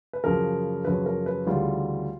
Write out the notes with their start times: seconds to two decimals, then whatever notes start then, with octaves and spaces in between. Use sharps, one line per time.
0.13 B4
0.24 F#2 C#3 F3 A#4
0.85 F#2 C#3 F3 B4
1.06 A#4
1.26 B4
1.46 D2 C#3 E3 G3 F4